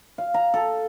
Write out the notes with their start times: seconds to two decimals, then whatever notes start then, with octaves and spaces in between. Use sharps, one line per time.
0.18 F5
0.34 A#5
0.54 A4